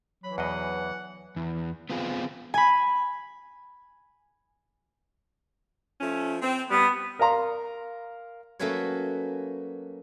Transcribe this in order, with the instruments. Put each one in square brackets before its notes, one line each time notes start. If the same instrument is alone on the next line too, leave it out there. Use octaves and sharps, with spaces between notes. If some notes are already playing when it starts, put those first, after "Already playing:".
[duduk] E3 [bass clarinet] F#3 [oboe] B5
[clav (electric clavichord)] E2 B2 D#5 [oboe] F#5
[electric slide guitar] E2
B3 C4 F4 G#4
[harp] G#5 B5
[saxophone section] F3 A3 C#4
C4
[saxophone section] G3 [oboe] B3
[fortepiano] A#4 D5 F5 A#5 C6
[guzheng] F#3 A3 A#3 C#4 B4 C#5